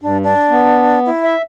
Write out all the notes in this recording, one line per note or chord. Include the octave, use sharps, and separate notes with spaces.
G2 D4
D4
B3
E4
E5